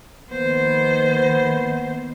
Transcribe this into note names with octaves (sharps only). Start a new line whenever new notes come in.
D#3 F3 A#3 B3 C5